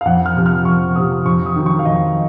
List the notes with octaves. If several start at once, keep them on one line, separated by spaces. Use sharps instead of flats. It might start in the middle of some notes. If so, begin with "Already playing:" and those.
F5
F2 F#5
F6
C3 F3
F6
F2 C#6
C3 F3 D#6
F2 C#6
D#6
D#3 F#3
C#6
F5
F2 D#5